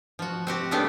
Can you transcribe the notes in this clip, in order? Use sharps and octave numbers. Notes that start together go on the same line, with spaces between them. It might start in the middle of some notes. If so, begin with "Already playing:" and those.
F3 F#4
C4 F#4 G4
C#3 G3 A3 B3 D4 G4